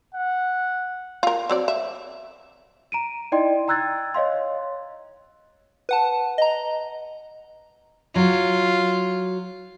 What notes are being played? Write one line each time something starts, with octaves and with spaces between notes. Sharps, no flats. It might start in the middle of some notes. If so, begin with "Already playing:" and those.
F#5
F4 A#4
F#3 C4 D5
E5
A#5 D7 D#7
D#4 E4 D5 D#5 G5 C6
G5 A#5 E6 F#6 G#6 A6
C#5 D#5 F5 C6
B4 F#5 A5
D#5 A#5
F#3 F4